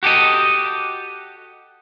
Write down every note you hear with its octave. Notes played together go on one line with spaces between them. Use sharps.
F#4 G4 A4 D#5